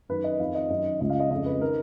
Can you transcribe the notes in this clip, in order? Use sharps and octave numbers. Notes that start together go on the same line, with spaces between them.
F#2 D#3 B4
D#5
F2 D#3 F5
D#5
F#2 D#3 D#5
C#2 C#3 D#5
F5
D#5
F2 C#3 D#5
B4
D#3 A#4